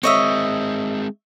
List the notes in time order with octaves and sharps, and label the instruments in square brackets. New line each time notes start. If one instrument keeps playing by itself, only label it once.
[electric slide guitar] G#3 C4 [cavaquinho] C#5 D#5 E5